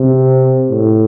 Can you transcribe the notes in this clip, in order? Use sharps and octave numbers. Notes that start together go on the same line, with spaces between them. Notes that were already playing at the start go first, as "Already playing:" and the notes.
Already playing: C3
A2